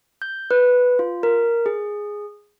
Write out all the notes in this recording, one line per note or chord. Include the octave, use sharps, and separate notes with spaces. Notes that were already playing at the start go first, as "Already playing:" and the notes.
G6
B4
F4
A#4
G#4